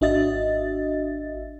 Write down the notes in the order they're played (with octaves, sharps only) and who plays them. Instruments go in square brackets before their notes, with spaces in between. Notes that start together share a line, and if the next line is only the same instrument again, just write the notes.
[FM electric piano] G#1 D4 F#4 D#5 E5 A6